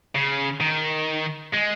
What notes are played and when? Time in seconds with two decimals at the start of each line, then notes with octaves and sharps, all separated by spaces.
0.15 C#3
0.60 D#3
1.53 G#3